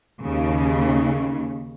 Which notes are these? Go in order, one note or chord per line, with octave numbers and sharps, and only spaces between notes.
D#2 C#3